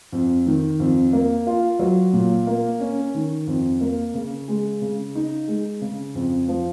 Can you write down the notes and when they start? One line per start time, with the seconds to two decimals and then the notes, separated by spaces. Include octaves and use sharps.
0.12 F2
0.46 D#3
0.80 F2
1.13 A#3
1.47 F4
1.79 F#3
2.13 A#2
2.47 A#3
2.80 C#4
3.14 D#3
3.47 F2
3.81 A#3
4.14 C#3
4.48 G#3
4.82 C#3
5.15 D#4
5.48 G#3
5.81 C#3
6.15 F2
6.48 F3